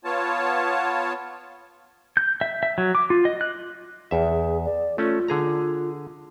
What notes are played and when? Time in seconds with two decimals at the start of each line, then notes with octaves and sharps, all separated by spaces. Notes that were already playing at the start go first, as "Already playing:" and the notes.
0.05 B3 F4 C#5 A5
2.17 G6
2.41 E5
2.63 E5
2.78 F#3
2.95 D6
3.10 F4
3.25 D#5
3.41 F#6
4.11 E2 G#4 E5
4.65 D5
4.98 A3 C#4 F4
5.28 D3 G#4 A#5